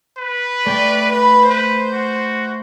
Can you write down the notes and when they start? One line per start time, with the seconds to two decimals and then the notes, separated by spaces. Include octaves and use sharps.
0.18 B4
0.67 A3 D5 G5
1.12 B4
1.50 B4 C5
1.92 F#4